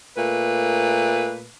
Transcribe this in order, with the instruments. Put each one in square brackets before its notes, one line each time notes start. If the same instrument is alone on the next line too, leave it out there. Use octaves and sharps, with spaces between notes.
[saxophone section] A#2 A3 B4